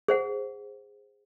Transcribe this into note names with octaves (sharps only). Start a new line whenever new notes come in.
G#4 C5 F#5